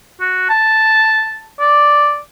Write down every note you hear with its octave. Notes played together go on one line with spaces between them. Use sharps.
F#4
A5
D5